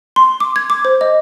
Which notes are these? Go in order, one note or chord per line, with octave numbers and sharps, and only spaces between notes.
C6
D6
G#6
D6
C5
D#5